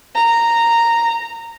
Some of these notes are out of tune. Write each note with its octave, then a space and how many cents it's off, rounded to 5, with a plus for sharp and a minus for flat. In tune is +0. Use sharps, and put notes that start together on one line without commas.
A#5 -10